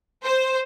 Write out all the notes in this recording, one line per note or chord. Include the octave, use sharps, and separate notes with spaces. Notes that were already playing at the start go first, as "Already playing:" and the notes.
C5